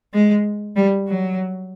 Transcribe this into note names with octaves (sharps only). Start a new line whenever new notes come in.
G#3
G3
F#3